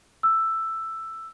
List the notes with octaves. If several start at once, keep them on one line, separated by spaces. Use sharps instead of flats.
E6